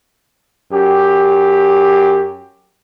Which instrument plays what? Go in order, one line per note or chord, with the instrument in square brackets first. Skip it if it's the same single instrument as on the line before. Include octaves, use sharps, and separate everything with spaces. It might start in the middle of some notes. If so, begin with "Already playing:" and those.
[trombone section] F#2 G4